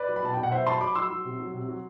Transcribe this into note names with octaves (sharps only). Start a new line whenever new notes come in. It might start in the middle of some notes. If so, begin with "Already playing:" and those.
Already playing: B4 D5
F#3
B5
B2 A5
B2 G5
F#5
F#3 C5 E5
F#3 A5 C6
F#3 B5 D6
F#3 C6 E6
F#3
C3
F#3
C3
F#3